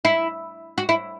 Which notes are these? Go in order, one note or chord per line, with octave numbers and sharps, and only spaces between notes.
E4
F#4
E4